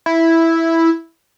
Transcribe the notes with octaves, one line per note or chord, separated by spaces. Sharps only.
E4